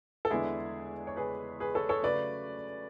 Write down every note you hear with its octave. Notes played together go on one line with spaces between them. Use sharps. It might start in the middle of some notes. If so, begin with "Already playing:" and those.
A4
E2 D3 G#3 B3 D4 E4 G#4
C#5
G#4 B4
G#4 B4
A4 C#5
A4 C#5
C#3 F#3 A3 B4 D5